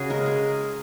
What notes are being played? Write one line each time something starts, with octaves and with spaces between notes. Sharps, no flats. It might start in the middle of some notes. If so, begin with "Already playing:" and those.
Already playing: C#3 F#4 G#4
G#3 A#4
G#4